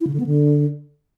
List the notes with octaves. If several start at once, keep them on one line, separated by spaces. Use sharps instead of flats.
E4
C#3
D3
B3
D3